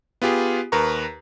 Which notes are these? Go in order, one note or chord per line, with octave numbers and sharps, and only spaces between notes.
B3 F4 G4 G#4
D#2 A#4 B4 A#5 C#6